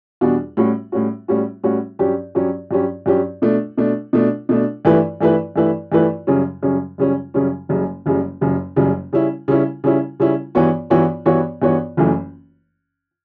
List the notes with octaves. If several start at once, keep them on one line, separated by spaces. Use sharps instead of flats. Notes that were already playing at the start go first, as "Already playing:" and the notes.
E2 B2 G3 D4 F#4
A2 G3 C#4 F#4
A2 G3 C#4 F#4
A2 G3 C#4 F#4
A2 G3 C#4 F#4
G2 F#3 C#4 G4
G2 F#3 C#4 G4
G2 F#3 C#4 G4
G2 F#3 C#4 G4
B2 A3 D4
B2 A3 D4
B2 A3 D4
B2 A3 D4
G2 E3 A3 E4 B4
G2 E3 A3 E4 B4
G2 E3 A3 E4 B4
G2 E3 A3 E4 B4
F#2 C#3 G3 C#4
F#2 C#3 G3 C#4
F#2 C#3 G3 C#4
F#2 C#3 G3 C#4
F#1 F#2 C#3 G3
F#1 F#2 C#3 G3
F#1 F#2 C#3 G3
F#1 F#2 C#3 G3
C#3 G3 C#4 E4
C#3 G3 C#4 E4
C#3 G3 C#4 E4
C#3 G3 C#4 E4
G2 E3 B3 F#4 C#5
G2 E3 B3 F#4 C#5
G2 E3 B3 F#4 C#5
G2 E3 B3 F#4 C#5
F#1 F#2 E3 A3